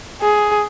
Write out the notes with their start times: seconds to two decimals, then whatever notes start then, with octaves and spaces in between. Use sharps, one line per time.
0.22 G#4